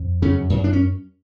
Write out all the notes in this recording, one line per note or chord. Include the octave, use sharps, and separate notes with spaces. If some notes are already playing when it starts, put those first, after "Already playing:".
Already playing: F2
F#2 C#3 C#4
F#2
D4
C#4